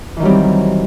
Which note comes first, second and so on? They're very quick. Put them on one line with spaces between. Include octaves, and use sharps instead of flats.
E3 D#3 F#3 G3 C4